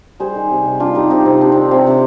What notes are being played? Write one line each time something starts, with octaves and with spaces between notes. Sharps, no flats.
G3 G#4 C5
D#3
C3
C3
G3 D4 F4
D#3 D#4 G4
C3 D#4 G4
C3 C4
G3 D4
D#3 C4
C3 C4
C3